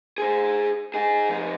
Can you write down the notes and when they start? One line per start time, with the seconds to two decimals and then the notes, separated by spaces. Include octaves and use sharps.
0.18 G#4 C5
0.94 D#4 G#4
1.29 F2 D#4